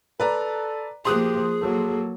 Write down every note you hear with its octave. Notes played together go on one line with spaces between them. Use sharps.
A4 B4 D5 A#5
F3 A#3 G4 G#4 C6 D#6 F#6
F#3 A#3 A4